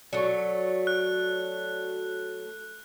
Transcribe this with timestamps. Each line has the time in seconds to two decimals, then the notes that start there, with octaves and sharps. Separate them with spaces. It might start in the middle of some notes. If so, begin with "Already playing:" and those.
0.13 F#3 A3 D5 C#6
0.87 F#6